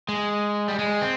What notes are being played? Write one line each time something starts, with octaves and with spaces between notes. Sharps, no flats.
G#3
G3
G#3
C4